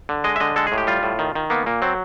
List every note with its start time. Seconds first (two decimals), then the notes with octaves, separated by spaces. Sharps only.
0.09 D3
0.24 G#3 D#5
0.36 E5
0.40 D3 D#5
0.56 G#3 A4
0.67 G#4
0.72 A2
0.78 G4
0.87 G3 F4
1.03 A2
1.19 D#3
1.35 D#3
1.50 A#3 B3
1.66 A#2 A#3
1.82 F#3 C4